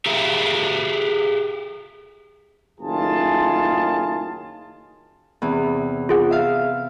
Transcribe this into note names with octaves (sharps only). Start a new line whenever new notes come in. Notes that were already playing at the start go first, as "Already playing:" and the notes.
G4 G#4 A#4 E5 F5 A#5
F#1 A2 D#3 F4 G#4 A5
E2 C3
F4 G#4 F#5
E5 F5